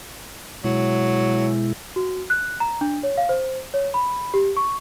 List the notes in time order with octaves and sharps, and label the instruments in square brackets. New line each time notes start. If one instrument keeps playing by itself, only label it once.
[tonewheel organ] B2 G#3 E4 [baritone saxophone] F#3
[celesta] F#4
F#6
A#5
D4
C#5
F5
C5
C#5
B5
G4
C#6